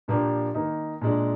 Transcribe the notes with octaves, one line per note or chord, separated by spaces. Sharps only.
A#2 F3 A#3 D4 G4
D#3 A#3 D#4
A#2 G#3 D4